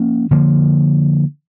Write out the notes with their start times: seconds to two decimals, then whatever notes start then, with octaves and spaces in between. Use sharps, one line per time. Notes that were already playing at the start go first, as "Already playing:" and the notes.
Already playing: F3 A#3 C#4
0.31 D3 F3 A#3